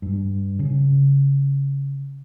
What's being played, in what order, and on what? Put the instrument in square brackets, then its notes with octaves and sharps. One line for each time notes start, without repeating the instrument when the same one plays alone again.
[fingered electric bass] G2
C#3